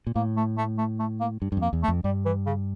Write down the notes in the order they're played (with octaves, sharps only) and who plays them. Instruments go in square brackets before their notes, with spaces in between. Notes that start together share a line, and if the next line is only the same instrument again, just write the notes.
[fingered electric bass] A#2
[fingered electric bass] A2 [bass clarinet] A#3
[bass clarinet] A3
A3
A3
A3
A#3
[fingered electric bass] G2
G2
[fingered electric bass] F2 [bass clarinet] A#3
[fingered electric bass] E2
[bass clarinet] A3
[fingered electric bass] F2
[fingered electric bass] G2 [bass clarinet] G3
[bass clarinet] E3
C#3